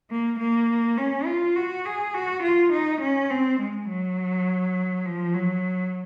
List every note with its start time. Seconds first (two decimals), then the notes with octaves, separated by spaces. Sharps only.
0.11 A#3
0.40 A#3
0.98 C#4
1.27 F4
1.56 F#4
1.86 G#4
2.14 F#4
2.43 F4
2.73 D#4
3.02 C#4
3.30 C4
3.60 G#3
3.89 F#3
5.06 F3
5.34 F#3